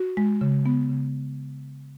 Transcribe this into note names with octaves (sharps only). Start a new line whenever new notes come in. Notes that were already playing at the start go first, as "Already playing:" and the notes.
Already playing: F#4
G#3
C#3
B3
C#3